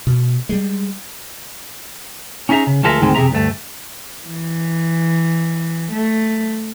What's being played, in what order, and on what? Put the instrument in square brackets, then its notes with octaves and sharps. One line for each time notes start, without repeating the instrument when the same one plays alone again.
[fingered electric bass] B2
G3 G#3
[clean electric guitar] C#4 D#4 G#4 E5 A#5
C#3
D2 F3 G#3 A4 A#4 E5
D2 G#2 D#3 G#3 C4
F2 C3 D#3 G#4 E5 A#5
D2 G2 A3
[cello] E3
A3